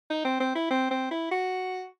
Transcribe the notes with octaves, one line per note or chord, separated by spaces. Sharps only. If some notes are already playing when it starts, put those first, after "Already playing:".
D#4
C4
C4
E4
C4
C4
E4
F#4